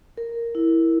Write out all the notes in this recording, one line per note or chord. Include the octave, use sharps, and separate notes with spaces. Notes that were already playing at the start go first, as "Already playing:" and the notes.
A#4
E4